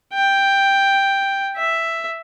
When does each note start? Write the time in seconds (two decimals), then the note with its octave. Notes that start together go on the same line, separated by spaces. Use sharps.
0.13 G5
1.56 E5